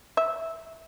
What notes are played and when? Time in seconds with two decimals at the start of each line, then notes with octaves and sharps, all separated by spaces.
0.17 E5